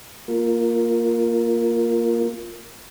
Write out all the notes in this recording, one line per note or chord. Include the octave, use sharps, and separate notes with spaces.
A#3 F4 A#4